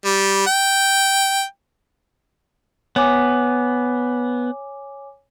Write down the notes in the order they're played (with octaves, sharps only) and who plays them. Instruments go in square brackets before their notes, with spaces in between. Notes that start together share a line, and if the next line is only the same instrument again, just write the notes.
[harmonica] G3
G5
[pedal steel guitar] B3 [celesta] C#5 G#5 D6